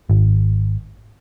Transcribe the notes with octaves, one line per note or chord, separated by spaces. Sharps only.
G#1